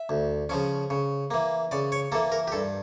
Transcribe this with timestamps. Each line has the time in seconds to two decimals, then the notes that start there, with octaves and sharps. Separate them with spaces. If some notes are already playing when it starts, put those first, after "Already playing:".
Already playing: E5
0.09 D2
0.49 C#3 F3 C#4
0.90 C#3
1.31 E3 A#3
1.71 C#3 D5
1.92 C#5
2.12 A#3 A4
2.14 E3
2.32 A#4
2.48 G4
2.52 G2 A4